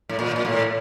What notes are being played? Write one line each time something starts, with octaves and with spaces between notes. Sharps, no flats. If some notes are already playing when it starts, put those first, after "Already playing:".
A2
A#2
A#2
A2